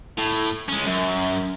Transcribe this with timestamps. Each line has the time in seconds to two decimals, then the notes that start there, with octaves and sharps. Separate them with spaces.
0.18 A2
0.69 G#3 C#4
0.86 F#2